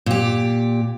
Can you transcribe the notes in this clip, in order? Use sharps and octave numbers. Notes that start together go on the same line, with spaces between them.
A#2 G4